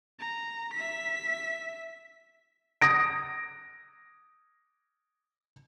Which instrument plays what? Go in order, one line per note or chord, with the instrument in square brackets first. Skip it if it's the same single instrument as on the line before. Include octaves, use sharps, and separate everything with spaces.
[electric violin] A#5
E5 B6
[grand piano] D#6 A#6 D7